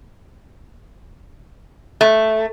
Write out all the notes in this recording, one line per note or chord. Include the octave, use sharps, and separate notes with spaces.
A3